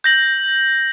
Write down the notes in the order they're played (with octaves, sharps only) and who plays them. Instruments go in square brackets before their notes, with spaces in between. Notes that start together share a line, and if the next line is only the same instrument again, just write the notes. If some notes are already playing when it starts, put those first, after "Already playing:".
[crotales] G6 A#6 F#7